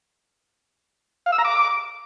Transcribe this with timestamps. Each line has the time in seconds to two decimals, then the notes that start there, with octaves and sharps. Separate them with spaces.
1.26 F5
1.32 E6
1.38 A#5
1.45 D6